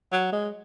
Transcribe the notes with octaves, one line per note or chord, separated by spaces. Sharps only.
F#3
G#3